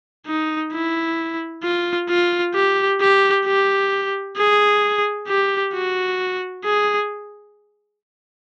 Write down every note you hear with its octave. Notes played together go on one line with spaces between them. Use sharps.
D#4
E4
F4
F4
G4
G4
G4
G#4
G4
F#4
G#4